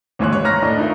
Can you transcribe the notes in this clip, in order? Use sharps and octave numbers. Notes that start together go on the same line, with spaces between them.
D#2 G#2 E3 C#5 C6 F#6
C#5
A#5 B5 F6 A#6
A2 D4 D#5
D#4 F4 A#4 E5